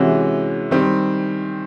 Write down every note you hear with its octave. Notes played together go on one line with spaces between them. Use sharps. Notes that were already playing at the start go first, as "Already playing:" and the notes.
Already playing: C3 E3 G#3 C#4 F#4
D#3 G3 C4